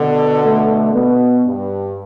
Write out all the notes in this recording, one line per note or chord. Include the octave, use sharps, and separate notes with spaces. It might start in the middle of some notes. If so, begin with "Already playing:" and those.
Already playing: B2 D3 B3
A3
B2 B3
G2